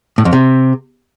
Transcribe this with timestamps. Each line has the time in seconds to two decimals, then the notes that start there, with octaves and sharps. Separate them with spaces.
0.18 A2
0.25 F2
0.33 C3